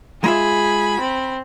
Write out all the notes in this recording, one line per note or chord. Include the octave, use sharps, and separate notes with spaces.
G#3 F4 G#4 E5 B5
C4